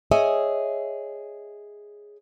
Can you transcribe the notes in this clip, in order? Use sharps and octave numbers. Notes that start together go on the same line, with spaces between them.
G#4 C#5 D#5 E5 G#5